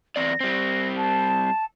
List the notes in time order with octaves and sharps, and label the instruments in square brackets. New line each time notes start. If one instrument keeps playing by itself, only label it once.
[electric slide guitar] E2 C4 D5 [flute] A#6
[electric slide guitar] G3 C4
[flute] A5